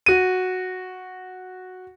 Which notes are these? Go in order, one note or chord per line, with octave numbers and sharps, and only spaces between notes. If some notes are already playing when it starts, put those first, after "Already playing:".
F#4 D#7